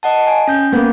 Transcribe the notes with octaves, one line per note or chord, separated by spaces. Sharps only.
D#5 F#5 A5
G#5
C#4 G6
A#3 B3